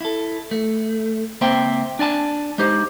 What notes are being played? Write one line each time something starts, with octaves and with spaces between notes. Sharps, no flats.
E4 A4
A3
C#2 A#3 C4 C5 E5 G5
D4 D5 G#5 A5
G#3 D#4 G4 C5